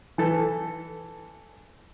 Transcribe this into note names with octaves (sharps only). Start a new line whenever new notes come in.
E3 A4 B4